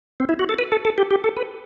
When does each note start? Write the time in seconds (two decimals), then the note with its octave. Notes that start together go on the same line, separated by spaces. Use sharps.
0.20 C4
0.29 E4
0.39 F#4
0.49 A4
0.59 B4
0.72 A4
0.85 A4
0.98 G4
1.11 G4
1.24 A4
1.37 B4